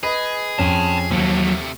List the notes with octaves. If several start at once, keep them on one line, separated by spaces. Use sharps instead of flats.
G#4 B4 D#5
F2 C#4 G5 A5
D#2 C3 F3 F#3 A3